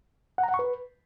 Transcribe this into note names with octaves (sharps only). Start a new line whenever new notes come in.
F#5
A#5
F#5
C#6
B4